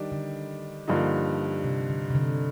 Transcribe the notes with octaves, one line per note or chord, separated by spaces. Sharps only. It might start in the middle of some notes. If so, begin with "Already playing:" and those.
Already playing: D#3 G3 D4
D3
G2 D3 F3 A#3 D#4
C3
D3
C3
D3